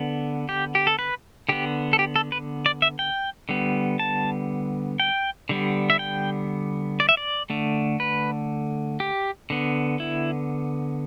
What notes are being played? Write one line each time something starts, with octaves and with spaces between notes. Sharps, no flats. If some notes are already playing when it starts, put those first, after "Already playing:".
Already playing: D3 B3
G4
G4
A4
B4
D3 B3 G4
A4
G4
A4
B4
D5
E5
G5
D3 G3 B3
A5
G5
D3 G3 B3
E5
G5
D5
E5
D5
D3 A3
B4
G4
D3 B3
E4